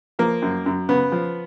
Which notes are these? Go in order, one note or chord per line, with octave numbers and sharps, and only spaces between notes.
F3 A#3
F#2
F#2
C#3 B3
F3